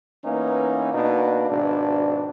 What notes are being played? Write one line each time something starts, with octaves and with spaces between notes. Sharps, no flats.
E3 A#3 B3 C#4 D#4
B2 A#3 D4 D#4
G#1 B2 D4